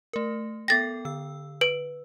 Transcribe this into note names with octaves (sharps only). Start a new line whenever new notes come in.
A3 A#4
B3 A4 G5 A6 A#6
D3 E6
B4 D7